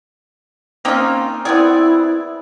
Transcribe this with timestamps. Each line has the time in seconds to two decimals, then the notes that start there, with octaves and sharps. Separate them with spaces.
0.85 A#3 C4 C#4 D#4 F4
1.45 B3 C4 E4 G#4 D5